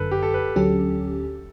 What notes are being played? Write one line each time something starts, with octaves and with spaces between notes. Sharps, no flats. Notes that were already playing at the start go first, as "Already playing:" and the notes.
Already playing: G1 F#2 D3 A4 B4
G4
A4
B4
D2 D3 F#3 C#4 G4 A4